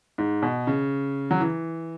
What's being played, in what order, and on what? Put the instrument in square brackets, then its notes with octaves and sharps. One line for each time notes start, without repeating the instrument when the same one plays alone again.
[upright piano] G#2
B2
C#3
F#3
E3